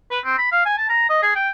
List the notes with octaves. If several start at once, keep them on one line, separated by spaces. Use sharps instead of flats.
B4
C4
B5
F5
G#5
A5
A#5
D#5
G#4
G5